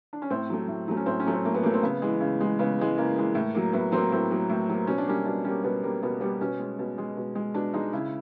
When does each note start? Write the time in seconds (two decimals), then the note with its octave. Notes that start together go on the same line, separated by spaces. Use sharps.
0.13 D4
0.22 C#4
0.30 A2 C4
0.50 F#3 A3
0.68 A2
0.88 F#3 A3
0.97 C#4
1.06 A2 C4
1.20 C#4
1.26 F#3 A3
1.33 C4
1.45 A2 A#3
1.55 B3
1.63 F#3 A3 A#3
1.74 C4
1.83 C#3 B3
2.02 E3 G#3
2.20 C#3
2.41 E3 G#3
2.59 C#3 B3
2.79 E3 G#3
2.97 C#3 A#3
3.16 E3 G#3
3.35 A2
3.55 F#3 A#3
3.73 A2 B3
3.92 F#3 A#3 C4
4.12 A2 C4
4.31 F#3 A#3
4.49 A2
4.69 F#3 A#3
4.87 B2 C#4
4.98 D4
5.06 G3 A#3 C#4
5.25 B2 D4
5.44 G3 A#3 C#4
5.64 B2 B3
5.83 G3 A#3
6.03 B2 B3
6.21 G3 A#3 B3
6.41 B2 C#4
6.60 G#3
6.79 B2
6.98 G#3
7.17 B2
7.35 G#3
7.54 B2 D4
7.74 G#3 D#4
7.93 C#3 E4